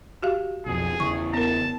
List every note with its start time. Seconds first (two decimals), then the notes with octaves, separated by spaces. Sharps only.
0.23 F#4 G4 F5
0.66 B1 F2 G#4
1.00 E2 C#3 E3 C#6
1.34 B3 A#4 A5